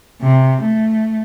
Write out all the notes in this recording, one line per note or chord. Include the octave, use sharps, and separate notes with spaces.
C3
A3